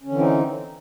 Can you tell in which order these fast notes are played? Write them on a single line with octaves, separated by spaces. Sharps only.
C#4 D3 E3 C4 D#4